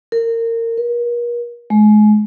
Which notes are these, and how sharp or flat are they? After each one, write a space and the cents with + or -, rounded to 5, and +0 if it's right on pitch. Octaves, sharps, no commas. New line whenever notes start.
A#4 -25
A#4 +40
G#3 +35